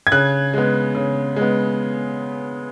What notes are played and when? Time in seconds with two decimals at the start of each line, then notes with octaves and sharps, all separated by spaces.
0.07 G#6
0.12 C#3 F#6
0.54 G#3 B3
0.95 C#3
1.36 G#3 B3